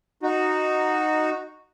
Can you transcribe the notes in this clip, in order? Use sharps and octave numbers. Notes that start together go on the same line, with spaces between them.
D#4 F#4